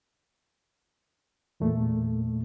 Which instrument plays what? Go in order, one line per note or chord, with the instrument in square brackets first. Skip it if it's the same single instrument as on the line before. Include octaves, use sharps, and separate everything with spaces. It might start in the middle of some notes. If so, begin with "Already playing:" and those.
[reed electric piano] E2 A#2 A3